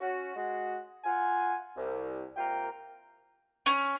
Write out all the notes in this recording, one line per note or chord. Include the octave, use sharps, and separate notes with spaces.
C#4 F#4
G#3 F#4
F4 F#5 G#5
C2
C3 A#3 F4 A#4 G5
C#4